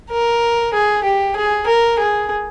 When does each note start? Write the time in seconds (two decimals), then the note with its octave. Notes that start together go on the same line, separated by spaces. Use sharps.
0.10 A#4
0.74 G#4
1.04 G4
1.36 G#4
1.67 A#4
1.99 G#4